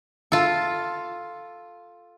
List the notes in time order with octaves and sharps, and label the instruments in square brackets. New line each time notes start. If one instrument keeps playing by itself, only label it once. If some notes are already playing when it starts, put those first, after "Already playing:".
[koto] F4 A4